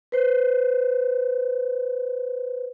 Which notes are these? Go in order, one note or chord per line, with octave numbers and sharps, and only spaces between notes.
B4 C5